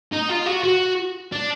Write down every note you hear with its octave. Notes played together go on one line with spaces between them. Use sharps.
D#4
F4
F#4
F#4
D4